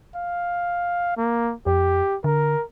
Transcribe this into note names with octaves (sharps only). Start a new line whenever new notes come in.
F5
A#3
F2 G4
D3 A#4